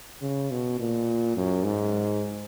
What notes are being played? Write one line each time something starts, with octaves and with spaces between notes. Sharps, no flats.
C#3
B2
A#2
F#2
G#2